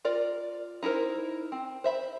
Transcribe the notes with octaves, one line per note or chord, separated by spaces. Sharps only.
F4 A#4 D5
D#4 E4 G#4 A#4 C5
C4
C5 E5 B5